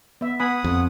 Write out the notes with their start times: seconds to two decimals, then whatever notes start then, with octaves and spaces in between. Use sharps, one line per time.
0.21 B3 E5
0.40 B3 F#5 G#5 B5 D#6
0.64 F2